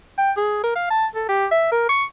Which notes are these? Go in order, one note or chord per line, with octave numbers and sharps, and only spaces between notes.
G5
G#4
A#4
F5
A5
A4
G4
E5
A#4
C#6